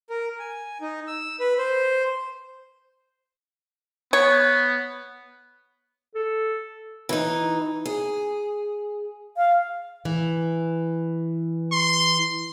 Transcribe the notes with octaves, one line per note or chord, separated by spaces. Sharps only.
A#4
G#5
D#4
E6
B4
C5
B3 C#5
A4
E3 D#4
G#4
F5
E3
C6